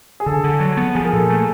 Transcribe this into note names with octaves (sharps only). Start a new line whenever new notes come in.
G#4
D3 A4
D3
F#3
B3
F3 G#4
A#4
A#2 A4
A3